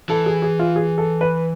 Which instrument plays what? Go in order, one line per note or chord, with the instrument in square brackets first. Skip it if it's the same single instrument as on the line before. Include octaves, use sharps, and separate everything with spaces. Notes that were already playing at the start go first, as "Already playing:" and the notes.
[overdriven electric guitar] E3 [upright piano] A4
[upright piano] G#4
G#4
F4
G#4
A4
B4